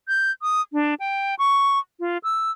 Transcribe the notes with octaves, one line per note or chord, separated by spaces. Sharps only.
G6
D#6
D4
G5
C#6
F4
E6